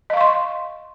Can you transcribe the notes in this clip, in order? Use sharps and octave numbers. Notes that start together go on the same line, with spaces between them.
D#5 F5 C6 C#6